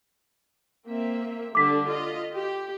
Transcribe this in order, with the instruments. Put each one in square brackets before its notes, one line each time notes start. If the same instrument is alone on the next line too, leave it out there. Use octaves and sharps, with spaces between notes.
[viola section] A#3 C4 E5
[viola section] D3 G3 D4 [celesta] D6 B6
[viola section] F4 D#5
G4